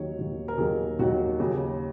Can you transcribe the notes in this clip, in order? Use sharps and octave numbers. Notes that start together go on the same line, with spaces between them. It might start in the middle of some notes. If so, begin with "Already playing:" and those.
Already playing: D#2 D#3 F#3 C#5
D#2 D#3 F#3
A#4
D#2 D#3 F#3 G#4
D#2 D#3 F#3 F#4
D#2 C#3 F#3